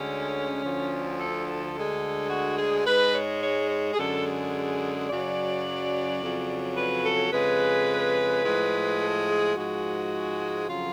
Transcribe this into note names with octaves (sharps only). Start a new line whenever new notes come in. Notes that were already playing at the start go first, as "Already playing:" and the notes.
Already playing: D2 D3 G#3 C#4
D2 D3 F3
A4
A4
D2 D3 G#3
F#4
G#4
G#2 G#3 B4
C#5
C#5
C#5
G#4
F#2 D3 G#3 A4
G#4
F#2 C#3 F#3 D5
F2 C#3 F#3
B4
A4
F2 C#3 G#3 B4
A2 F3 G#3
A4
G#4
G#2 F3 G#3 F#4
F2 C#3 F#3 F4